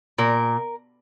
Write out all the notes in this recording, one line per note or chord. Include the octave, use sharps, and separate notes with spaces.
A#2 A#4